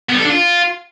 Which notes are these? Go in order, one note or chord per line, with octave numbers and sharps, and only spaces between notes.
B3
G3
A4
D4
F4